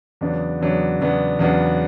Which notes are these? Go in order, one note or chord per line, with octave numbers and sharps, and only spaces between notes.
E2 C#3 F#3 B3 D4
E2 C#3 F#3 B3 D4
E2 C#3 F#3 B3 D4
E2 C#3 F#3 B3 D4